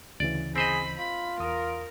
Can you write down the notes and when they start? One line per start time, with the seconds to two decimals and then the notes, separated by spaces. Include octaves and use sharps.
0.20 D2 C#3 E3 D5
0.56 C4 G#4 C5 D#5 B5
0.99 F4 B5
1.40 E2 A#4 D#6